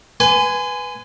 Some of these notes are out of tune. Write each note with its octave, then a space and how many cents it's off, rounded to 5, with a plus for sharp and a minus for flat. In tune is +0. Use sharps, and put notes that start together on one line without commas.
B4 +0 G#5 +0 C6 -40